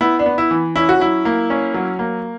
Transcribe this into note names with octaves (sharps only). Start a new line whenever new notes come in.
B3 E4
D4
B3
E4
E3
C#4 E4
F#4
F#3 E4
A#3
C#4
F#3
A#3